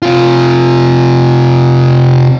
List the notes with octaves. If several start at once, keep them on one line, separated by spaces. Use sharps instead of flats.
C3 F4